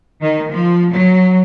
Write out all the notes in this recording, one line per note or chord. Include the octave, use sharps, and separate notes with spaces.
D#3
F3
F#3